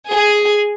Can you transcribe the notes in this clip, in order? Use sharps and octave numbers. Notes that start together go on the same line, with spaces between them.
G#4